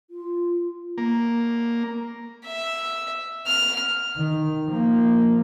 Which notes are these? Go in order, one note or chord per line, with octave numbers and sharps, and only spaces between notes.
F4
A#3
E5
F6
D#3
F3 A#3